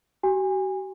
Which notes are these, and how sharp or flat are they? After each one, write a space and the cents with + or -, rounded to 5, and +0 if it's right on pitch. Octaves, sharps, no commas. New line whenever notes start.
F#4 +45 G#5 -30